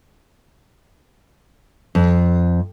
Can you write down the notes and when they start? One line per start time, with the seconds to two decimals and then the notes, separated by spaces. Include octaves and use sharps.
1.95 F2